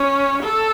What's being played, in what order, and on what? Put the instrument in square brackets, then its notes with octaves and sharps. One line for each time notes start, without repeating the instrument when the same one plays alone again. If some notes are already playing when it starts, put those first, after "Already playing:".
Already playing: [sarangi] C#4
A4